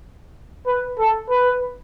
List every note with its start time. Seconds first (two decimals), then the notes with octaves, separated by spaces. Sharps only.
0.67 B4
0.99 A4
1.30 B4